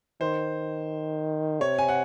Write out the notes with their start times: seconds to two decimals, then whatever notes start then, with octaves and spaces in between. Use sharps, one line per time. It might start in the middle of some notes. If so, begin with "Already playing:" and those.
0.21 D#3 C5
1.60 C3 C#5
1.79 G#5
1.89 F#5